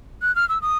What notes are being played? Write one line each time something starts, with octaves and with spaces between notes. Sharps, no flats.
F#6
F6
E6
D#6